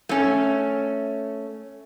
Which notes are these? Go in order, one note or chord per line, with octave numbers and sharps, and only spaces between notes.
A3 C#4